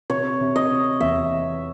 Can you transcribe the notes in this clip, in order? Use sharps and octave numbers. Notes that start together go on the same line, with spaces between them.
C3 C#5
C3
D#5
C3
E2 E5
E3